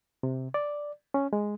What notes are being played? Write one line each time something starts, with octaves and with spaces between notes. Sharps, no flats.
C3
D5
C#4
G#3